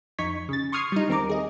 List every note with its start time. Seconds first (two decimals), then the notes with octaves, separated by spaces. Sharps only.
0.19 F2 D#4 C#6 G#6 B6
0.49 C#3 A6
0.72 C6 C#6 D#6 F6 G#6 C7
0.92 G3 D#4
1.09 D#2 C4 A#4 A#5 D6
1.29 G#4 D#5